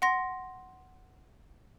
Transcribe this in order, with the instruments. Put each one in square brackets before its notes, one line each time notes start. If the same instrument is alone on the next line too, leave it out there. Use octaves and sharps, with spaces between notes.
[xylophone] F#5 C6 A#6